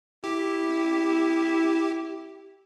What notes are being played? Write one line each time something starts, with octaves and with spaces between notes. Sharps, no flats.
E4 G4